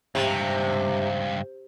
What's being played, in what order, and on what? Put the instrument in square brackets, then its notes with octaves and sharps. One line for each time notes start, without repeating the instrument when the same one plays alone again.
[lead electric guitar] C#2 G2 [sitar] C3